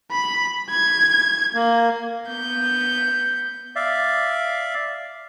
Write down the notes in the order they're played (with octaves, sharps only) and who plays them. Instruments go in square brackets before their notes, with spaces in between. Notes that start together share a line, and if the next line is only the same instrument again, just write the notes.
[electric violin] B5
G#6
[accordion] A#3
[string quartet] B3 G6
[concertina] D5 E5 F5